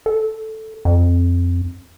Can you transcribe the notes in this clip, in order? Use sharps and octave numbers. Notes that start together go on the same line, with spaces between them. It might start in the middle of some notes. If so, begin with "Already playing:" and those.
A4
F2